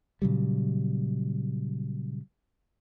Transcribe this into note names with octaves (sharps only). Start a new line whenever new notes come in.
A#2 C#3 F#3 G3